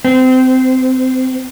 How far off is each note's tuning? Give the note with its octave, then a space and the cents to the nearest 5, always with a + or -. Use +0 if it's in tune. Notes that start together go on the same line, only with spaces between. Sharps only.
C4 -20